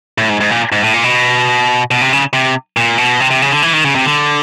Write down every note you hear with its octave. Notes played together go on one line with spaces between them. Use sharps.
A2
G#2
G#2
A#2
G#2
A2
A#2
B2
B2
C3
C#3
C3
A#2
B2
C3
C3
C#3
D3
E3
D#3
C#3
C3
D3